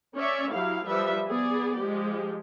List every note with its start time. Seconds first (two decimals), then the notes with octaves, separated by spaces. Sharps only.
0.16 C#4 C#5 D5 E5
0.53 F#3 E4 G4 F5
0.86 F3 G3 B4 E5
1.29 B3 G#4 D5
1.80 F3 G#3 G4